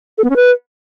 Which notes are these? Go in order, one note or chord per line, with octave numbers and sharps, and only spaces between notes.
A4
B3
C#4
B4